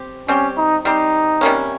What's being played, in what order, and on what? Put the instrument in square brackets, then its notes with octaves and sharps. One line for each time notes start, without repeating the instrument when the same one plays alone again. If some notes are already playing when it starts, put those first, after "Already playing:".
Already playing: [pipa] C4 G4
[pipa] G3 C4 G4 [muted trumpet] C#4
[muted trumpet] D#4
[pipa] G3 C4 G4 [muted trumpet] D#4
[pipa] C3 G3 A#3 C#4